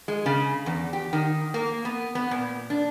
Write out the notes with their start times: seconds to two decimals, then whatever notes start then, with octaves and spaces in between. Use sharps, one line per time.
0.08 G#3
0.26 C#3
0.66 E2
0.93 G4
1.13 D#3
1.54 A#3
1.85 B3
2.15 B3
2.31 A#2
2.70 D4